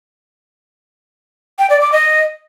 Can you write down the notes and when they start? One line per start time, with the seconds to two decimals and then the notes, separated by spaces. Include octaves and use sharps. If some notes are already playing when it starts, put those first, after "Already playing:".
1.59 G5
1.70 D5
1.81 D6
1.92 D#5